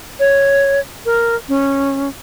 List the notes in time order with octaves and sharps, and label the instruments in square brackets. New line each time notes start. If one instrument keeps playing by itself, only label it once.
[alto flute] C#5
A#4
C#4